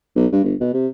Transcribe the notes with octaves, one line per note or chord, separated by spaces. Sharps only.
B1
G2
G1
B2
C3